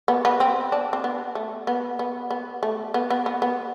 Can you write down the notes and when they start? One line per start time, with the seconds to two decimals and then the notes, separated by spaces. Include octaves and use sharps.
0.08 B3
0.25 B3
0.40 C4
0.72 D4
0.93 C4
1.04 B3
1.35 A3
1.67 B3
1.99 B3
2.31 B3
2.63 A3
2.94 B3
3.10 B3
3.26 B3
3.42 B3